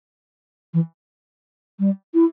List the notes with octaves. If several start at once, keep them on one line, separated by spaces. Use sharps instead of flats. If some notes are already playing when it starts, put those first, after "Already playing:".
E3
G3
E4